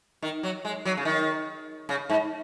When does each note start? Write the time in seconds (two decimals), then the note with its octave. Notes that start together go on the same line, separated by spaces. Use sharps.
0.22 D#3
0.43 F#3
0.65 G#3
0.85 F#3
0.97 C#3
1.05 D#3
1.89 C#3
2.10 G#2